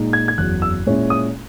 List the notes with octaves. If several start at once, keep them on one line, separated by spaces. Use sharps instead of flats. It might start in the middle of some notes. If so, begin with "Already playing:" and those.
Already playing: A#2 G#3 D#4
G#6
G#6
F#1 E2 C#3 F#3 F#6
E6
A#2 G#3 C#4 E4
D#6